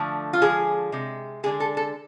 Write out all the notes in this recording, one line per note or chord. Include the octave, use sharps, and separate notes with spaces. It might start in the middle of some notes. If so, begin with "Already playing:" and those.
Already playing: D3 F3 A3
F4
D3 F3 G#3 G#4
C3 G#3
D3 G#3 G#4
A4
A4